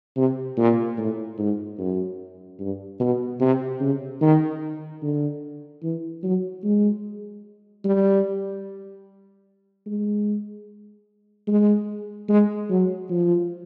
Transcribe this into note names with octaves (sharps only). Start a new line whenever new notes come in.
C3
A#2
A2
G#2
F#2
G2
B2
C3
C#3
D#3
D3
E3
F#3
G#3
G3
G#3
G#3
G#3
F#3
F3